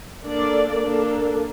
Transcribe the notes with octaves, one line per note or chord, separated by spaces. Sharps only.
A#3 D4 A4 D5
A#3 D4 A4